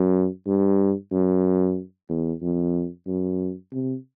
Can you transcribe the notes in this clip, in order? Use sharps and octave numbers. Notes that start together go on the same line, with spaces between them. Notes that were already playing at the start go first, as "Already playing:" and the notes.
Already playing: F#2
G2
F#2
E2
F2
F#2
C3